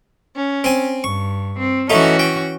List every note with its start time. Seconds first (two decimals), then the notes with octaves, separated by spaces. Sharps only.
0.35 C#4
0.64 C4 G#5
1.04 G2 C#6
1.58 C4
1.90 E3 A3 C#4 D#4 F#4
2.19 G5